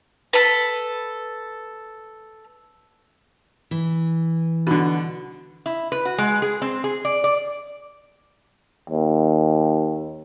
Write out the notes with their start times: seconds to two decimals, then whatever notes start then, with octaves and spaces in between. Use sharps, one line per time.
0.33 A4 B4
3.71 E3
4.67 B2 D3
5.66 E4
5.92 B4
6.05 F#4
6.18 G#3
6.42 G#4
6.62 C4
6.84 G#4
7.05 D5
7.24 D5
8.90 D#2